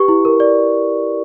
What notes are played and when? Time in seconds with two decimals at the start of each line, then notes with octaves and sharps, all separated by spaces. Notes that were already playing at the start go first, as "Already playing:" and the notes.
Already playing: G4 B4 C#6
0.08 E4
0.25 A#4
0.40 D5